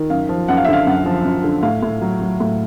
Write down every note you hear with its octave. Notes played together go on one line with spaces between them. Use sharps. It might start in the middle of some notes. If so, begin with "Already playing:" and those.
Already playing: D#3
F#2 F5
F3
F#2 F#5
F5
E5
D3
F5
F#2 F#5
F3
F#2
D3
A2 F5
A2
F#3
F#3
A2